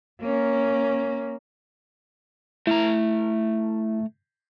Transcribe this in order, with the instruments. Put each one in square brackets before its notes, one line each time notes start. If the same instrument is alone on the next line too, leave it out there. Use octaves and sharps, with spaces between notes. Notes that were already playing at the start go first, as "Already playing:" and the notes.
[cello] A#3 C#4
[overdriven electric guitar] A3 A#5 [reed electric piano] E4